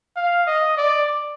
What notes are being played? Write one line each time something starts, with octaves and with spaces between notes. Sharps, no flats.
F5
D#5
D5